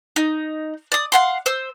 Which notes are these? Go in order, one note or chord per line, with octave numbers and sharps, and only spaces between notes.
D#4
D5 D#6
F5 F#5 C6
C5 E6